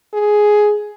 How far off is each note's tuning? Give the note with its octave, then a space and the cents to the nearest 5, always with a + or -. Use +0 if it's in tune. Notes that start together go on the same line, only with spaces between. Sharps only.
G#4 +10